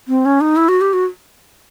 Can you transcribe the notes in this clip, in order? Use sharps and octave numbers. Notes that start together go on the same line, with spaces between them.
C4
C#4
D#4
E4
F#4
G4
F#4